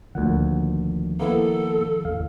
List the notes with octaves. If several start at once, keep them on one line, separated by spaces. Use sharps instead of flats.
D2 A#2 D#3 F3 F#5
A#3 B3 E4 A4
D1 A1 E2 F5